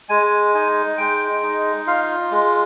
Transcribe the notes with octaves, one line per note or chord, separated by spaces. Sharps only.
G#3 G#5
D#4 G#5
G#3 G5
D#4
F4 F5
G#3